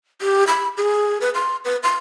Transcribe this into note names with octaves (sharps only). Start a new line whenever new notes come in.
G4
B5
G#4
B4
C6
B4
C6